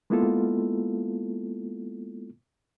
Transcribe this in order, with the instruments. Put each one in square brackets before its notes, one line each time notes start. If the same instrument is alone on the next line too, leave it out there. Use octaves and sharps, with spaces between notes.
[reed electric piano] G#3 A#3 B3 E4 F4 A4